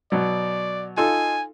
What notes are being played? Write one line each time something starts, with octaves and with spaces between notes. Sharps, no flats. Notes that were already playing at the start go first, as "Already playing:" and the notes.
B2 F#3 D5
D#4 F4 A4 G#5